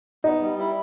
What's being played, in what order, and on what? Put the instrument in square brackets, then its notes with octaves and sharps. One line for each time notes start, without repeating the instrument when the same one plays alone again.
[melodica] B3 [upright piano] D#4
[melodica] G3
E4